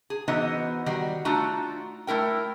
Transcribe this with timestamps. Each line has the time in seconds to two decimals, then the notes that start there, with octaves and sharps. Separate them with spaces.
0.10 G#4
0.28 E3 B3 D#4 F#4 C5 D#5
0.86 D#3 G3 F#4
1.25 A3 D4 D#4 F4 F#4 A#5
2.07 A3 E4 A#4 G5